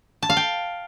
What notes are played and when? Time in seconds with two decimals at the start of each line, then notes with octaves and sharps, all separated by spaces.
0.22 A5
0.30 F5
0.37 G5